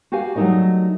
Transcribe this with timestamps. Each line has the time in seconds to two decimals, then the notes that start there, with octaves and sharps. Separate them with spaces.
0.12 F#4 G4 A#4 F5 G#5
0.36 F#3 G3 A3 D#4 A#4 D#5